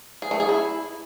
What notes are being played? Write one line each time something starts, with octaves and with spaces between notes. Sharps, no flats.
G#4
A3
G#4
E4